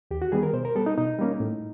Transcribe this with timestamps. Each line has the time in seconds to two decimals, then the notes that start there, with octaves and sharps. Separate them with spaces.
0.11 D#2 G4
0.22 F#4
0.32 D#3 G3 B3 G#4
0.43 A#4
0.53 B2 C5
0.65 A#4
0.75 G3 B3 A4
0.86 D#4
0.97 B2 D#4
1.19 G3 A#3 C#4
1.40 A2